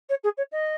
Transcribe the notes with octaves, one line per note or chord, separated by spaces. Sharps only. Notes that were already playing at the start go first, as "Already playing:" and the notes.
C#5
G#4
C#5
D#5